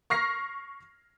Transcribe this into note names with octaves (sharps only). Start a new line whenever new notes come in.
C#6 F6 A#6 C7